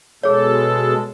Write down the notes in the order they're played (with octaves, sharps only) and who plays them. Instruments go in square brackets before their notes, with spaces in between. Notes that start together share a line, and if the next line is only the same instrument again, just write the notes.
[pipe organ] B2 G#3 A4 [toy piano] G#4 C#5